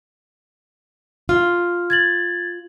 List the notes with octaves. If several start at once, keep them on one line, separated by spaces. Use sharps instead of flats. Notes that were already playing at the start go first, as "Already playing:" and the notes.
F4 F6
G#6 A6 F#7